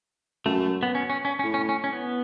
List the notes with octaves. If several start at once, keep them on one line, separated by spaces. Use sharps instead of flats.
F#2 A3
A3
B3
C#4
C#4
C#4
C#4
A2
C#4
C#4
C#4
B3